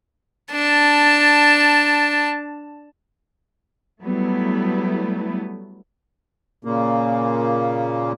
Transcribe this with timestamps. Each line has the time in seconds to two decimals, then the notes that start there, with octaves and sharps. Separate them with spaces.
0.52 D4 A5
4.02 F#3 G3 A3 B3 E4
6.65 A#2 C#3 A#3